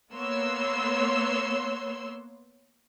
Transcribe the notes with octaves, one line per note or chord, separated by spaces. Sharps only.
A#3 B3 C#5 C6 E6